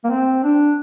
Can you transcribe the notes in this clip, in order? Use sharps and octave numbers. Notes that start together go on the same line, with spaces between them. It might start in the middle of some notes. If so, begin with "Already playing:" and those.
A#3
C4
D4